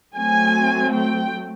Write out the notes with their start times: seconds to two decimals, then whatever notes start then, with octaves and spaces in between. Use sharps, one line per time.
0.16 F#3 A3 C4 G#5
0.94 G5